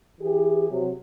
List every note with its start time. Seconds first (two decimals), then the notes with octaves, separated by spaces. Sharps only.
0.21 E3 G4 G#4
0.71 C3 F#3